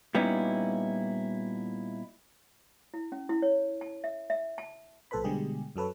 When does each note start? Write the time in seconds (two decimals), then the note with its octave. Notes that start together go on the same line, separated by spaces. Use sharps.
0.15 A#2 G3 B3 C#4 D#4 E4
2.94 E4
3.12 C#4
3.29 E4
3.42 C#5
3.81 A5
4.04 E5
4.30 E5
4.58 A5
5.11 B1 A#2 A4 B4 C5 B5
5.24 B2 D3 G3 G#3 G4 G#4
5.76 F#2 F#3 A4 B4 C#5